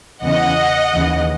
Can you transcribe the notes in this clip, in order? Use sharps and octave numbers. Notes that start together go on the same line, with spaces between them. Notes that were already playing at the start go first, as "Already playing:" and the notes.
E2 C#3 E3 D#5 F#5
D#2 C#3 E3